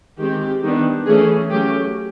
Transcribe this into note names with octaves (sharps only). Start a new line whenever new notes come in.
D#3 G#3 C4 G4
D#3 G3 B3 D4
E3 A3 C#4 G#4
F#3 A3 C#4 G4